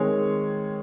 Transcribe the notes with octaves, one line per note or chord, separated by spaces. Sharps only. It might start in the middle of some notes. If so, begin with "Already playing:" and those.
Already playing: D#3 G#3 C4 C#5